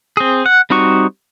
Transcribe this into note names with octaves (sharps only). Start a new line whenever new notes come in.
C4 G#4
F#5
G3 C4 D#4 F#4 C#6